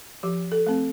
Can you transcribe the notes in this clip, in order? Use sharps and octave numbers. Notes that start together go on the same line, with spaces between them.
F3 G4
A4
A3 C4